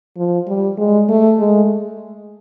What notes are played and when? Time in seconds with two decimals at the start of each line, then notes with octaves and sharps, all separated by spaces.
0.17 F3
0.48 G3
0.78 G#3
1.09 A3
1.39 G#3